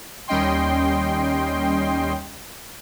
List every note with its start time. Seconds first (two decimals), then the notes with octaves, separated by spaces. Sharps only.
0.28 D#2 G3 C#4 D#5 G5 C6